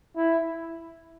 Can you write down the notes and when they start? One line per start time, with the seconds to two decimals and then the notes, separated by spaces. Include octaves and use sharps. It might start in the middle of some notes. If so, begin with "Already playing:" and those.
0.16 E4